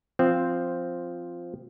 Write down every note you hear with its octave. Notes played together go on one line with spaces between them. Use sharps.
F3 C4